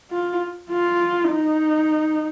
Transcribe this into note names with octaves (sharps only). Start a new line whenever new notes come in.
F4
F4
D#4